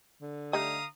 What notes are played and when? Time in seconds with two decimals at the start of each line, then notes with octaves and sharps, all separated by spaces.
0.21 D3
0.53 G3 A3 D#4 F5 A#5 D#6